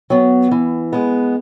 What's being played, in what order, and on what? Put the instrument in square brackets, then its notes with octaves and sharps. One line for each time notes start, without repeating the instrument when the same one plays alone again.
[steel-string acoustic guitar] F#3 B3
E3
G#3 B3